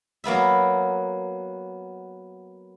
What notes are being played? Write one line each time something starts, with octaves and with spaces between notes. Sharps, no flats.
F#3 A#3 B3 E5